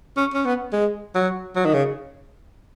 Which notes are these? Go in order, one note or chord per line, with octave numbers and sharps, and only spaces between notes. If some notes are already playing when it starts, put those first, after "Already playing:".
C#4
C#4
B3
G#3
F#3
F#3
D#3
C#3